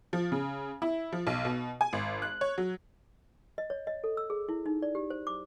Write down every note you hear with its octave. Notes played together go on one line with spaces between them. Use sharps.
F3
C#3
E4
F3
B1
B2
G#5
G#1
F#6
C#5
F#3
D#5
C#5
D#5
A4
E6
G#4
E4
D#4
D5
G4
C5
D6